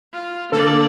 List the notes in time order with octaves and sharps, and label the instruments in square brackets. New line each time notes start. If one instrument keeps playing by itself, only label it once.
[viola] F4
[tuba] D3 [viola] A#3 D5 [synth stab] A4